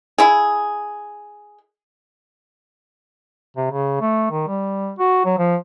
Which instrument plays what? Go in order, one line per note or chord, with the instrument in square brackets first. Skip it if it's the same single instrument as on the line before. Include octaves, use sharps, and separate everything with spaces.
[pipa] E4 G#4
[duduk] C3
C#3
A3
D#3
G3
F#4
F#3
F3